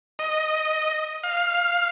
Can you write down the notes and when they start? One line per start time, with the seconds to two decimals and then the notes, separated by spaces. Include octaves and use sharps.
0.19 D#5
1.23 F5